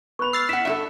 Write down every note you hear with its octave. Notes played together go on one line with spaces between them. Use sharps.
B3 B5 C#6 F#6 F7
E6 F6 A6 C7
E4 F#5 B6 E7
G2 F#4 A4 E5